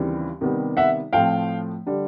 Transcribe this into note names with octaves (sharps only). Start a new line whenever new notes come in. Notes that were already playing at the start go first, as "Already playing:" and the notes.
Already playing: D#2 C#3 E3 G3 C4
C3 D#3 G3 B3
E5 F#5
A2 F3 A3 C4 F5 G5
D3 G3